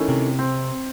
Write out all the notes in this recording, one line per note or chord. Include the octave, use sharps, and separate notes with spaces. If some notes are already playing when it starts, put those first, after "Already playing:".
Already playing: D#3 A3 C#4 E4
C3
C4